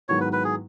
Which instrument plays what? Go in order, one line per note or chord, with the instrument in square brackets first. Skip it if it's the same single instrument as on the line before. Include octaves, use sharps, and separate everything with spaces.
[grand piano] G#2 D#3 F#3 B3 E4 [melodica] C#5
[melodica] B4
B4
G#4